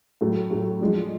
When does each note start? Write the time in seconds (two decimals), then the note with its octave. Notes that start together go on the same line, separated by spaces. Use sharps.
0.21 A2 F#3 A3
0.51 A2 F#3 A3
0.81 F3 G#3 D4